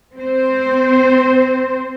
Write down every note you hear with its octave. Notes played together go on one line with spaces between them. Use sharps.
C4 C5